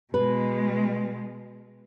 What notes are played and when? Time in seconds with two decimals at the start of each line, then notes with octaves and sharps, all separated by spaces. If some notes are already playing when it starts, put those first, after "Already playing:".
0.14 B2 G#3 B4